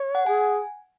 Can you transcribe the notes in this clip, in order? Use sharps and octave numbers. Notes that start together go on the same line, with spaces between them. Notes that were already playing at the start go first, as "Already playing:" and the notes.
Already playing: C#5
F#5
G#4 G#5